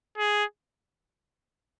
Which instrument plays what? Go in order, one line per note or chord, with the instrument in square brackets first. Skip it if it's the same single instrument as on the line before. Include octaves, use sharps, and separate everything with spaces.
[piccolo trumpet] G#4